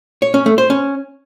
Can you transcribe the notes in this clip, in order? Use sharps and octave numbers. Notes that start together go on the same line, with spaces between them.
C#5
C#4
A3
C5
C#4